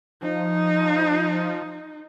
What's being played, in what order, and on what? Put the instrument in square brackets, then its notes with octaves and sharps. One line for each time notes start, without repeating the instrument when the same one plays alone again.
[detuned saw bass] F3 [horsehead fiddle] D#4